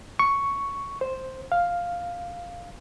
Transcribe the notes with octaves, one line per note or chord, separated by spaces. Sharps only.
C#6
C5
F5